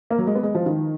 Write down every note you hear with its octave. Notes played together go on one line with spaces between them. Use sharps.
A#3
F#3
G#3
B3
G#3
F3
D#3